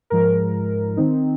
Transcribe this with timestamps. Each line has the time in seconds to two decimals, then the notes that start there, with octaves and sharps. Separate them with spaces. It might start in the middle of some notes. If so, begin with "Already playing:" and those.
0.10 G#2 F3 G#3 A#4
0.97 D#3 C4 D#4